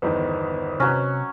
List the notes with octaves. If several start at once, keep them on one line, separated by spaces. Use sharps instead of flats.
G1 E2 D#3 B4 C5 D#5
C3 F#3 C#4